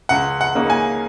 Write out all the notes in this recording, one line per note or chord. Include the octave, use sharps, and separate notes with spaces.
C#2 F#5
F#5
C#3 A#3 D#4
G#5